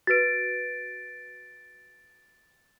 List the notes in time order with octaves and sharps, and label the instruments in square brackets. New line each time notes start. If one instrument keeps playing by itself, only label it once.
[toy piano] F#4 B4 [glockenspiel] A6 D7